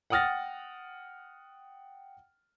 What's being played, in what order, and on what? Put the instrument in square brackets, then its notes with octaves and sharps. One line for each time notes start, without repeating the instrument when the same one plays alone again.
[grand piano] F#5 G5 D#6 F6 A6 A#6